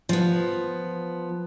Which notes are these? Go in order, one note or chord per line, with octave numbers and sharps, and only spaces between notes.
F3 B3